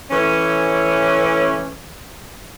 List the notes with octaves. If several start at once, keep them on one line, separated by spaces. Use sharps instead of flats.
E3 A3 C#4